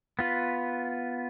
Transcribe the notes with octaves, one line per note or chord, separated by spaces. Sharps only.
B3 F4 B4